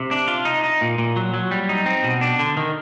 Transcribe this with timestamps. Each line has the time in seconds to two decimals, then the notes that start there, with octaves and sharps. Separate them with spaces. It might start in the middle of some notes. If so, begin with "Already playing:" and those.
Already playing: C3
0.11 D4
0.28 F4
0.45 D#4
0.64 D#4
0.81 A#2
0.98 A#2
1.16 F#3
1.34 F#3
1.51 G3
1.69 D#4
1.86 C4
2.04 B2
2.21 D4
2.39 D3
2.57 D#3